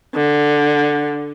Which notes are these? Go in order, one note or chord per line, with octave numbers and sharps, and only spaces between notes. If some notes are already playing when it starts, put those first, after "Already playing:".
D3